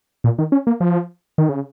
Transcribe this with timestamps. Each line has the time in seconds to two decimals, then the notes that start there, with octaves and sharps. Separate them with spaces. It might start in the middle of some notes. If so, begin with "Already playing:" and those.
0.24 A#2
0.39 D#3
0.52 C#4
0.67 A#3
0.81 F3
1.38 D#3
1.49 C#3